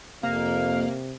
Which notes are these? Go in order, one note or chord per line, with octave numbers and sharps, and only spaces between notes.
F2 C3 A#3 F5